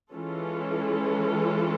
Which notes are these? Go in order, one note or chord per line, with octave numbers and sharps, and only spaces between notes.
E3 G#3 C#4 F4 A4